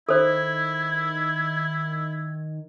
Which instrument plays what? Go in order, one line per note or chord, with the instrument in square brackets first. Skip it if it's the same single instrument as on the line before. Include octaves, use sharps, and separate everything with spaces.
[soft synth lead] D#3 [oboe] E4 [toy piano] A4 C5 [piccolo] G#6